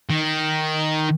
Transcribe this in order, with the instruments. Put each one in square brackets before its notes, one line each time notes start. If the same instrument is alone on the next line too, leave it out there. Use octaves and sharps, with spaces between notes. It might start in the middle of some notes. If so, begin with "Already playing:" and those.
[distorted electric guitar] D#3